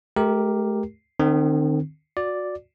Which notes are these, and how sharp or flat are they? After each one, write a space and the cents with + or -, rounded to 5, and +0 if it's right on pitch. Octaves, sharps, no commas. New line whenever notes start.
A3 -40 G4 +0 A#4 +0
D#3 -40 C4 +0
F#4 -25 D5 +0